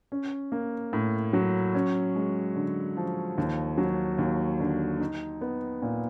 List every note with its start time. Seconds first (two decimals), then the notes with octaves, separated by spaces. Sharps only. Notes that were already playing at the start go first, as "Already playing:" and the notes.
0.12 C#4
0.52 A#3
0.93 A2
1.33 F#3
1.75 C#4
2.16 G#3
2.56 D3
2.97 F3
3.38 D#2
3.78 F#3
4.18 D#2
4.60 D3
5.00 D#4
5.41 B3
5.82 A#2